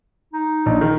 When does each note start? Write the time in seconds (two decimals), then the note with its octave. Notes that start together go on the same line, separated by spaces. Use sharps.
0.33 D#4
0.66 A#1 D#5
0.81 D#3